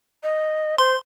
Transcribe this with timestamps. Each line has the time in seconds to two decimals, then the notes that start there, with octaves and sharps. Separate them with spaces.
0.23 D#5
0.78 C5 C6